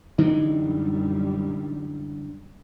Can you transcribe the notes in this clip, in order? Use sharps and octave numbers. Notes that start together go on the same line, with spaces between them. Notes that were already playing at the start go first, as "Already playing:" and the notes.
A#1 F#2 D3 E3 G3 G#3 D#4